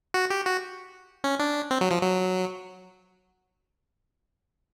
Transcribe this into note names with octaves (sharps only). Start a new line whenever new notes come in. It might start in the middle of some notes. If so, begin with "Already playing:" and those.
F#4
G4
F#4
C#4
D4
C4
F#3
F3
F#3